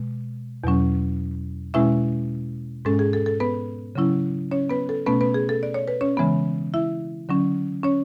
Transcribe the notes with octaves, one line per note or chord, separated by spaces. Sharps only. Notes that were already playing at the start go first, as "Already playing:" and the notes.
Already playing: B2 G#3
E2 B2 F#3 C#4
B2 G#3 C#4 E4 E5
G#2 G#3 C#4 A4
G#4
A4
A4
B3 B4
C#3 F#3 C#4 E4
C#4 C#5
B3 B4
A4
B2 A3 B3 C#4 B4
B3 B4
G#4
A4
D5
C#5
B4
C#4 C#5
C#3 E3 G#3 B3
E4 E5
D3 F#3 C#4
C#4 C#5